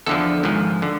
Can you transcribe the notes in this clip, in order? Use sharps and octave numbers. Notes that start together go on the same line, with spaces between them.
E2 D3 F3 A4
G#1 G#2 F3
D3